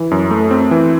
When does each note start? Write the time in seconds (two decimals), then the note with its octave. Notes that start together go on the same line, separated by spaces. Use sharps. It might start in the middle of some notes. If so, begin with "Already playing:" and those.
Already playing: E3
0.11 F#2
0.31 A3
0.51 C4
0.71 E3